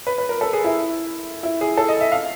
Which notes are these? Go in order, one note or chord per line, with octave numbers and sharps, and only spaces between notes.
B4
B4
A#4
A4
G#4
E4
E4
G#4
A4
D#5
E5
F5